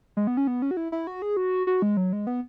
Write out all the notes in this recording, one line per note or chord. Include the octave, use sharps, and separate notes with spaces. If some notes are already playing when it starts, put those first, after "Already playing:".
G#3
B3
C#4
B3
C#4
F#4
E4
E4
F#4
G#4
F#4
F#4
G#3
F#3
G#3
B3